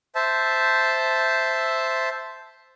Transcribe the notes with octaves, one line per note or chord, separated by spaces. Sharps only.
C5 E5 A5